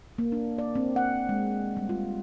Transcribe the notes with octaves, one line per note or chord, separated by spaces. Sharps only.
A#3
D4
D5
C4
F#5
G#3
G3
F4